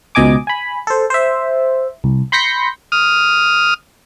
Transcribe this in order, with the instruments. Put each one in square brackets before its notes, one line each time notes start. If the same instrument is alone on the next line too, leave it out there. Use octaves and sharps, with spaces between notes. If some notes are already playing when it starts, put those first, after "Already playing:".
[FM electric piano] C#2 B2 D#5 G#5 D6
G#5 B5
A4 C5
C5 E5
C2
B5 C6 G6 A#6 B6 C#7
[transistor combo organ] D#6 F6